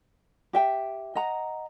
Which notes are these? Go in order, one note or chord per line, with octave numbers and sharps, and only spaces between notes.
G4 E5 G5
D#5 F#5 A#5